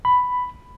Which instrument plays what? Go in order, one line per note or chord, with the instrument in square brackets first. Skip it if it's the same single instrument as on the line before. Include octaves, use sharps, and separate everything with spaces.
[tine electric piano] B5